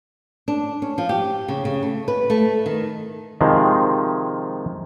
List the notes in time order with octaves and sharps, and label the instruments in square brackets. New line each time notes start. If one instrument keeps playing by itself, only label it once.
[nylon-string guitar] D4
C#4
F3
G4
C#3
C#3
A3
B4
A3
D#3
[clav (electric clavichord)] C3 D#3 F3 G#3